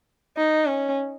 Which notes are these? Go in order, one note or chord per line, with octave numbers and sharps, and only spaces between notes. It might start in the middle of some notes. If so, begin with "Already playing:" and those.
D#4
C#4